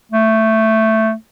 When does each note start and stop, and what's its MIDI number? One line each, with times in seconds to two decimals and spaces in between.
0.12 1.13 57